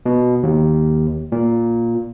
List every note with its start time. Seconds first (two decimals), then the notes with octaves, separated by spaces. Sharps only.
0.06 B2
0.43 D#2
1.32 A#2